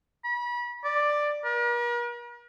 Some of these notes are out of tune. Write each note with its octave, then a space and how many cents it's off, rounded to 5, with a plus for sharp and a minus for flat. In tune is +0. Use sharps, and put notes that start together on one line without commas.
B5 -35
D5 +5
A#4 +45